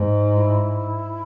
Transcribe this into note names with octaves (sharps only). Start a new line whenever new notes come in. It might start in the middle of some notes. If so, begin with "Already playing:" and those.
Already playing: G#2
E4